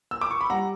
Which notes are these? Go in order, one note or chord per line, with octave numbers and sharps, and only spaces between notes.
E6
D6
C#6
B5
G3 F#5 A#5